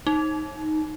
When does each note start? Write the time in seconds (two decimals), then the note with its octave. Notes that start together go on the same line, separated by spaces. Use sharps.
0.07 D#4